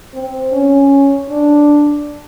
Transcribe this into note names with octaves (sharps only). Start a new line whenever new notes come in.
C4
C#4
D4